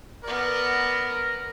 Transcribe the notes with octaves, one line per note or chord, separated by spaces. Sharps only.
B3 A#4 D5